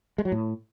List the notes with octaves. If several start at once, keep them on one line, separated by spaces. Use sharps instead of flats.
G#3
F#3
A2